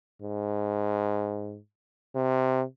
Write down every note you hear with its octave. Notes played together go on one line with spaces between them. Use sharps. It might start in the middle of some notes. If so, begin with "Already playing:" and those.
G#2
C3